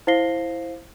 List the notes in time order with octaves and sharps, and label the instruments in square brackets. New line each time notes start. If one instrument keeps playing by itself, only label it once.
[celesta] E4 C5 F5 A#6 C7 G7